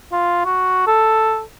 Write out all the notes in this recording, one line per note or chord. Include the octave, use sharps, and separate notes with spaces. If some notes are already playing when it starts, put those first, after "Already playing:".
F4
F#4
A4